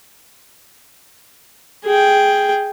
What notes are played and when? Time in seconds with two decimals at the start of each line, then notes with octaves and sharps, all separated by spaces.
1.85 G#4 G5